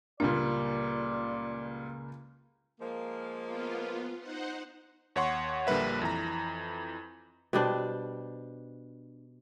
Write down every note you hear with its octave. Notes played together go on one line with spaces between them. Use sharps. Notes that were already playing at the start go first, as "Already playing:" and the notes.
C#2 A#2 G3 A#3 D4 F4 D5
F3 G#3 A#3
B3 F4
D#4 C5 F#5
D#2 C#5 F#5 C6 C#6
A#1 D3 G3 A#3 B4 E5
F2 E3 A#5
B2 G3 D4 C5